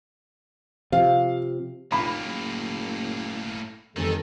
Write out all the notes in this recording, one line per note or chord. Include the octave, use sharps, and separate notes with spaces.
C3 F3 F5
F1 A2 A#3 B5
F#1
G1 F2 D#3 E3 A4